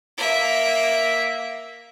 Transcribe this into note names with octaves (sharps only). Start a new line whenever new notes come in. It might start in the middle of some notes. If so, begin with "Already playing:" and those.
A#3 E5